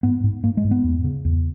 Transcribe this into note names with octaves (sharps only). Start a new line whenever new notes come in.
G#2 B3
G#2
G#2 A#3
G#3
G#2
B3
E2
C#3
E2